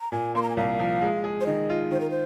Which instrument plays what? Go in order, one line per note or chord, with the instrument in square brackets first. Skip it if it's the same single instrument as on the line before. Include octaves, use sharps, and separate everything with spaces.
[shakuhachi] A#5
[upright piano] A#2 [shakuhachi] G#5
[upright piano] A#3 [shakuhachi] C6
[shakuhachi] A#5
G#5
[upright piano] C2 [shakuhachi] F5
[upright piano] F3
G#3
G#4
[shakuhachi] C5
[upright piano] D#3 [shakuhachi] D#5
[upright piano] F4
[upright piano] D#3 [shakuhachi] C5
[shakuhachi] A#4
C5